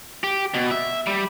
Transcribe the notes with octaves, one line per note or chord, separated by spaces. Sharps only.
G4
B2
E5
G3